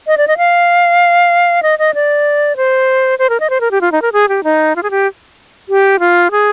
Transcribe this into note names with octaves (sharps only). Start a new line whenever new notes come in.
D#5
D5
D#5
F5
D#5
D#5
D5
C5
C5
A#4
D#5
C5
A#4
G4
F4
D#4
A#4
G#4
G4
D#4
F4
G#4
G4
G4
F4
G#4